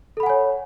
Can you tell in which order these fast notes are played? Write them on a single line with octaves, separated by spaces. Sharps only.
A4 B5 F#5 G#5 C#5